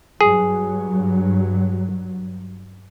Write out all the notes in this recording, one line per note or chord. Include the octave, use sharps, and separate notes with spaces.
G2 F#3 G#4